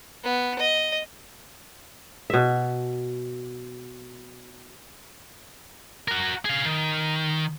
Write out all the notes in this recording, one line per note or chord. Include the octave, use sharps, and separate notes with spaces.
B3
D#5
B2 E5
F#4 A#4
G#4 F5
D#3